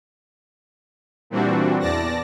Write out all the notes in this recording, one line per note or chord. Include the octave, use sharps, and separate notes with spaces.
A#2 E3 G3 C4 D4 F#4
E2 D5 A5 A#6